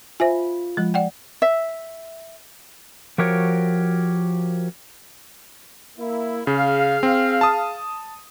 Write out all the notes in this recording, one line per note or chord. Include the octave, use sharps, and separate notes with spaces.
F4 C5 E5 G#5
F3 G#3
D5 F#5 G5
E5
F3 F#4 G4 A#4 C#5
A#3 E4
C#3 G#4 F5
C4
A5 D#6